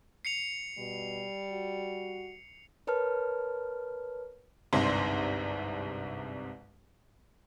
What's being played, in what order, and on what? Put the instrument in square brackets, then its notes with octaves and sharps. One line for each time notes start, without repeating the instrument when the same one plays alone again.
[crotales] C7 C#7 F7
[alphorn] B2 [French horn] G3
[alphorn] F#4
[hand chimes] A#4 B4 C#5 A5 F6
[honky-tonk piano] G1 C2 G#2 C3 D4 C6